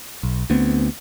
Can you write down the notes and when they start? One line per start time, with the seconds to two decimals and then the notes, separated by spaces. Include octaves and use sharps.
0.23 B1
0.50 D2 A3 B3 C4